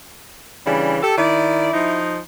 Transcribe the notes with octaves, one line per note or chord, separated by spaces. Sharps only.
C#3 E3 G3 D4
G4 A4
D#3 E4 D5
F3 D#4